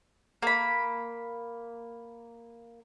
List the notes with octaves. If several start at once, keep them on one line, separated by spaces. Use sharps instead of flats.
A#3 B5